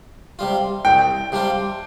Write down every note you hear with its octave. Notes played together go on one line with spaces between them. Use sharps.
C3 G3 F4
C2 G5
C3 G3 D4 F4